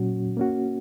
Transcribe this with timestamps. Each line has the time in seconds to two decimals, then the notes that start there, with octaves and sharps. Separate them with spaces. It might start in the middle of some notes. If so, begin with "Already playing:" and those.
Already playing: A#2 F#3 C#4 F#4
0.37 A#3 C#4 F#4